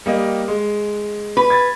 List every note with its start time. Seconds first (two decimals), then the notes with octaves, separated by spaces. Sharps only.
0.06 G3 A#3 D#5
0.48 G#3
1.37 B4
1.50 G#6 A6